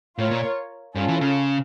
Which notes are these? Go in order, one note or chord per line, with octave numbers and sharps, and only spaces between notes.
A2 F4 A#4 C#5
A#2
G2 C#4 F4 A4
E3
C#3